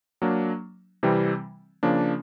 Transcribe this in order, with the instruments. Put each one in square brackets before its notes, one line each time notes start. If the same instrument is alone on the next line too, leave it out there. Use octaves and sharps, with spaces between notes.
[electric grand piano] F#3 A#3 D4
C3 E3 G3 C4
C#3 F3 A#3 D4